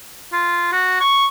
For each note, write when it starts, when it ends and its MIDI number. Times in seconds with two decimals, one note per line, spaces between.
0.33 0.69 65
0.73 1.00 66
1.00 1.27 85